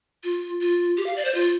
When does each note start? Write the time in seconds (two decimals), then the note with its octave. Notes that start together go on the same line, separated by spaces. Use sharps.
0.24 F4
0.61 F4
0.97 G4
1.06 F5
1.16 D5
1.25 C5
1.35 F4